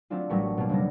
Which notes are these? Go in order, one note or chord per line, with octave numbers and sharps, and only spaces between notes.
F#3 A3 C4 D4 F4
A1 F#3 G3 A3 A#4 C#6
B2 A#3
F1 C#3 G3 D4 C#5 A#6